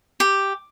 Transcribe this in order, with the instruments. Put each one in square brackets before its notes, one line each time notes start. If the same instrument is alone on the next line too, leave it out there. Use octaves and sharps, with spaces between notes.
[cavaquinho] G4